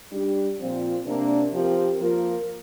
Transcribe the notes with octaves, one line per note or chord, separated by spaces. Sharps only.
G3 D4 G4
A#2 F3 C4 F4
C3 A#3 D4
F3 C4 G4 A#4
F3 A#3 F4 A#4